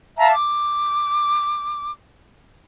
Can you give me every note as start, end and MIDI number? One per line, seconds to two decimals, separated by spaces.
0.17 0.33 76
0.17 0.33 77
0.17 0.33 81
0.17 0.33 82
0.34 1.90 86